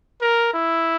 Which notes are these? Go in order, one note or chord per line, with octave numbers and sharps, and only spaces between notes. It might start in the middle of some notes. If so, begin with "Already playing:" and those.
A#4
E4